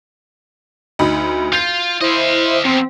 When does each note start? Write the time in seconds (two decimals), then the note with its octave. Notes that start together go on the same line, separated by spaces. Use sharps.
0.99 D2 D#4 B5
1.53 F4 G6 C7
2.01 E4 C5 D#5 F5
2.65 E2 C4